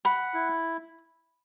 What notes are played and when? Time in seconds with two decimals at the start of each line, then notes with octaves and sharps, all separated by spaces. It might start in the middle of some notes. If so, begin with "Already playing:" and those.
0.05 F#5 B5
0.34 E4